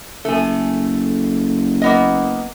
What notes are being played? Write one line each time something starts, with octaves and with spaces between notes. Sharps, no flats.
F#1 A3 A4 G#5
A#3 B3 D#5